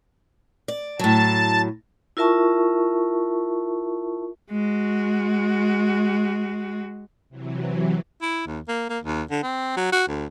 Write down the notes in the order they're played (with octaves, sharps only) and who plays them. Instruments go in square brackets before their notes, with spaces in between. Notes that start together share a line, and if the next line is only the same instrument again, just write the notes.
[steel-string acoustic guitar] D5
[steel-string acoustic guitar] A2 F#3 [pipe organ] A5
[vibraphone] E4 F4 A#4 E5 A5 C#6
[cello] G#3 F#4
[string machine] C3 E3 F#3
[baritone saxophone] E4
D#2
A#3
A#3
D#2
D3
C4
F#3
F#4
D2